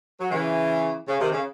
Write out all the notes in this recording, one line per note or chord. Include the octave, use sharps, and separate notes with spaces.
F#3
C#3 E3
C#3
C3 D#3
C#3